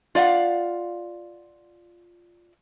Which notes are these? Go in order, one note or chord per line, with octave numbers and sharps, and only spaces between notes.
F4 D5 F5 F#5